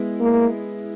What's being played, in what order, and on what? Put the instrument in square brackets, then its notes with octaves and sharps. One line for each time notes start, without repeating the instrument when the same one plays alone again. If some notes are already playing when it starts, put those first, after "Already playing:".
Already playing: [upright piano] G#3 B3 E4
[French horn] A#3